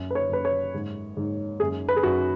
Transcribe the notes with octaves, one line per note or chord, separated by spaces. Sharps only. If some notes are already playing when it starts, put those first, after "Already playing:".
Already playing: F#2
B4
C#5
F#2 B4
C#5
G#2
G#2
F#2 G#4
B4
G#4
F#2 F#4